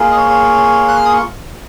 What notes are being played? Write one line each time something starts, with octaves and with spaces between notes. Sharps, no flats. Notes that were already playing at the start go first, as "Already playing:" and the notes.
Already playing: A#3 F4 G#4
D#5
C#5
C#5
F#6
F6
D#6
C#6